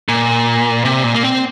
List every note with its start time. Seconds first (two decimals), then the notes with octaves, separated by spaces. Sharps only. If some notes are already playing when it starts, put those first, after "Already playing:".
0.09 A#2
0.85 C3
1.04 A#2
1.15 A#3
1.23 C4